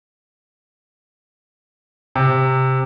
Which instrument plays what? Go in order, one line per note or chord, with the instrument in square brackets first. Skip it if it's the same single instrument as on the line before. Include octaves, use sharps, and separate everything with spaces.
[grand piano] C3